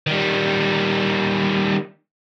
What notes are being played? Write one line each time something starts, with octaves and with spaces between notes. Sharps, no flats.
D#3 G3